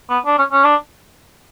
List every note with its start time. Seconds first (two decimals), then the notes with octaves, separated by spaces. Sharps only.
0.09 B3
0.26 D4
0.38 C#4
0.52 C#4
0.64 D4